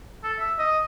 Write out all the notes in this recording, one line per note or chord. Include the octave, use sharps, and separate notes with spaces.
A4
E5
D#5